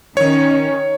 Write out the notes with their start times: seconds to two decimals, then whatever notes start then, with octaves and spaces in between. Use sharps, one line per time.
0.17 D#3 C#4 C#5